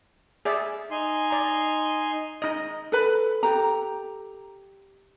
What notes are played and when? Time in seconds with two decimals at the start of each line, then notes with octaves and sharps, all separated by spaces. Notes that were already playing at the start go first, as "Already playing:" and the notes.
0.45 G#4 D5 E5
0.91 D#4 G#5 C6
1.30 D5 A#5
2.42 D#4 D#5
2.92 A4 B4 B5
3.43 G4 A4 A#5